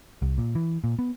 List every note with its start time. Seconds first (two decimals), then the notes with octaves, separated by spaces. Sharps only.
0.22 C2
0.38 A#2
0.55 E3
0.84 A#2
0.99 B3